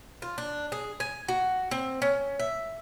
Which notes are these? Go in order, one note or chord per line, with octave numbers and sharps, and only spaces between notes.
F4
D4
G#4
G#5
F#4
C4
C#4
E5